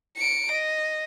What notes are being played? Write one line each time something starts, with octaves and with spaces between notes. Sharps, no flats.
C#7 D7
D#5